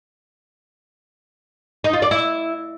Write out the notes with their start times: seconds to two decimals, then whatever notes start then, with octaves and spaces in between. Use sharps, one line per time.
1.84 D#4
1.93 F4
2.02 D5
2.11 E4